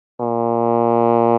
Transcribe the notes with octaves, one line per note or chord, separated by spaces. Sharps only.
A#2